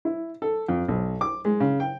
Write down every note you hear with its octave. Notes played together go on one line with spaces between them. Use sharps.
E4
A4
F2
B1
D6
G#3
C#3
G5